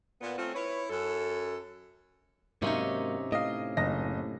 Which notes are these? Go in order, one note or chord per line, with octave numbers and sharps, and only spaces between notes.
A#2 B3
A3 C4 C#4 F4 A4
E4 B4 C#5
F#2 A4
G#2 C3 F#3 A#3 C#4 D#4
A2 D#5 F5
F#1 D#5 A#6